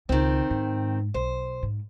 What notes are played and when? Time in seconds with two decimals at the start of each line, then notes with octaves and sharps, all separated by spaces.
0.09 C#2 D#3 C4
0.50 G#2
1.14 B1 C5
1.63 G#2